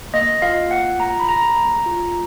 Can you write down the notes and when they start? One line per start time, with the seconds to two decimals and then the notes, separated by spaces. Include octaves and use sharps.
0.14 A#3 D#5
0.42 F4 F5
0.71 F4 F#5
0.99 A#3 A#5
1.20 B5
1.28 G#4 A#5
1.57 A#3
1.86 F4